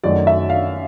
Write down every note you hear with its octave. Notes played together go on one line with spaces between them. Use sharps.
F#2 D#3 F#3 A3 D5
E5
F5